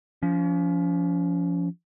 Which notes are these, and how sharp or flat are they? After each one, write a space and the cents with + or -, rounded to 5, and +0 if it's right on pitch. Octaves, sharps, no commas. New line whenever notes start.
F3 -10 C#4 +40